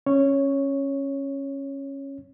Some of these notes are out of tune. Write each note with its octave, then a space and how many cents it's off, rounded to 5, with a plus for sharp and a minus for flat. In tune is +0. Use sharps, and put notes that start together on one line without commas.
C#4 -15 C#5 +0